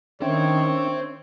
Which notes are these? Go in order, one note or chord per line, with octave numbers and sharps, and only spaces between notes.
D#3 C#4 D4 C5 C#5 E5 G5